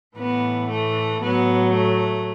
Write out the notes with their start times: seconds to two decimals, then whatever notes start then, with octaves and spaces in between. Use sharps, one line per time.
0.16 A2 E3 B3
0.69 A3
1.22 A2 F#3 B3
1.74 A3